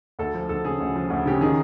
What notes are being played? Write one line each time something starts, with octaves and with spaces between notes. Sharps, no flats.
D2 A4
F3
D2 A4
C#3 G#4
D2
F3
D2
C#3 G4
D#3 G#4